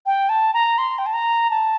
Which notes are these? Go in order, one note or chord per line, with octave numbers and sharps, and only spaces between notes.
G5
A5
A#5
C6
G5
A5
A#5
A5